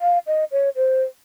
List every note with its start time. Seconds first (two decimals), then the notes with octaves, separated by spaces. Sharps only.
0.01 F5
0.27 D#5
0.52 C#5
0.76 C5